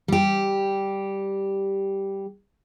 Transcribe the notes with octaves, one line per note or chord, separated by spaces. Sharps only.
G3 G4